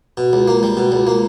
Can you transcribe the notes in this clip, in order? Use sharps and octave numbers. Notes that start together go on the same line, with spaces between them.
B2
C#2
A#3
G3
B2
C#2
A#3